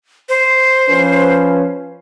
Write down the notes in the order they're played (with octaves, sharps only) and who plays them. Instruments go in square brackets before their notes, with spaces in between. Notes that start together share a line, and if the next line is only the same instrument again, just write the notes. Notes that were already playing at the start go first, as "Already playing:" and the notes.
[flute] C5
[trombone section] F3 C#4 B4